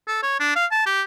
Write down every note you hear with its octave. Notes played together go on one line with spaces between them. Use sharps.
A4
C#5
D4
F5
A5
G4